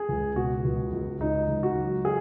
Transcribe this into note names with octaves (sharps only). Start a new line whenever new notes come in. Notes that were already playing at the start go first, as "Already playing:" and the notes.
Already playing: G#4
C#2
B2 F#4
C#2
C#2
C#2 D#4
C#2
F#4
F#3
G#4